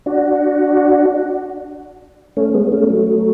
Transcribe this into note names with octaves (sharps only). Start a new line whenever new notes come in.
D4 F#4
A3 C#4
G#3 B3
A3 C#4
F#3 A3